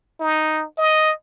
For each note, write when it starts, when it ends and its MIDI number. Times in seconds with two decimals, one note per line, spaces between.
0.20 0.65 63
0.78 1.12 75